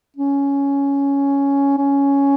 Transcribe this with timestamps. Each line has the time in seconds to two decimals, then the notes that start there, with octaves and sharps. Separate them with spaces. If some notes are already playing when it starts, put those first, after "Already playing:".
0.16 C#4
1.78 C#4